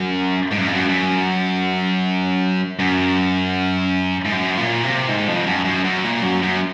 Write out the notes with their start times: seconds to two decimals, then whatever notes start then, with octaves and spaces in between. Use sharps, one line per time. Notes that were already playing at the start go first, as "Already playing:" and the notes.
Already playing: F#2
0.51 G#2
0.58 F#2
0.66 F2
0.74 F#2
0.89 F#2
2.79 F#2
4.25 G#2
4.31 F#2
4.57 A#2
4.83 C3
5.08 G#2
5.28 F2
5.47 F#2
5.65 F#2
5.85 F#2
6.04 A#2
6.23 F#2
6.43 F#2